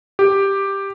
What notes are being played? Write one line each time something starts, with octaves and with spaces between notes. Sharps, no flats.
G4